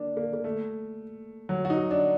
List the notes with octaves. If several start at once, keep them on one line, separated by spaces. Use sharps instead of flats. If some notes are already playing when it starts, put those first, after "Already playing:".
Already playing: A#3 D4
A#3
A#3
A3
F#3
F#4
D#4
D4